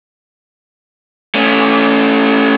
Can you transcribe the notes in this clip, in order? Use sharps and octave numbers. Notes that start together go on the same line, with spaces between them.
A3 C#4